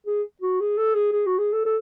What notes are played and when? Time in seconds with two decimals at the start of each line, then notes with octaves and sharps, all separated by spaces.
0.07 G#4
0.42 F#4
0.60 G#4
0.78 A4
0.94 G#4
1.12 G#4
1.26 F#4
1.38 G#4
1.53 A4
1.65 A4